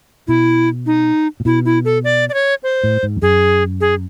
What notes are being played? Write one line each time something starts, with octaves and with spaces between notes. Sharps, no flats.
B2 E4
D#4
A#2
B2 E4
E4
A4
D5
D5
C#5
C5
A2
G#2
F2
F#2 G#4
G#4